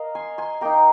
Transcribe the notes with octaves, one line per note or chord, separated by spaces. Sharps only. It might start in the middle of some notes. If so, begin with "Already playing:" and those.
Already playing: A#4 D#5 F5
G#5 C6
G#5 C6
A#3 D#4 G5 A#5